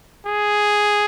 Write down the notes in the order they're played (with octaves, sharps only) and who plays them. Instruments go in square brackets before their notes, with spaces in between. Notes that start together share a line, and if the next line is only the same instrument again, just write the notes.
[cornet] G#4